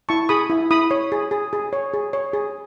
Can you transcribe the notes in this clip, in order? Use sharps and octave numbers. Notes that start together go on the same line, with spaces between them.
E4 A5 C#6
G#4 B5 D#6
E4
E4 B5 D#6
C#5
G#4
G#4
G#4
C#5
G#4
C#5
G#4